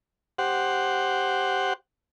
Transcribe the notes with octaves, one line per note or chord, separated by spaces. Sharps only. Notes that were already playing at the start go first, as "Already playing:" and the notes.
G4 C5 F#5